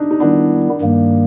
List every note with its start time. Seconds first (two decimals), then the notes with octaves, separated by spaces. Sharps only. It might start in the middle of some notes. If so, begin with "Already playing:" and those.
Already playing: D4 D#4
0.11 D#4
0.20 D#3 G3 B3 D4 E4
0.81 G2 D#3 G3 A#3